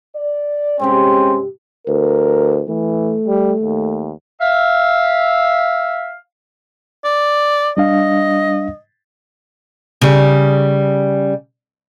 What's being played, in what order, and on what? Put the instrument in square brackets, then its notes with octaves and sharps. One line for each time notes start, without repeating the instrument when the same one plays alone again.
[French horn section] D5
[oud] G2 C3 G4 [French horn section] G#3 C#4 [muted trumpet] C4
[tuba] D2 [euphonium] A#4
[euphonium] E3 [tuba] A3
[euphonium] G3
D#2
[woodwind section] E5 F5
[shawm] D5
[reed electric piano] G3 D4 F5 [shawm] D#5
[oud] C#3 G3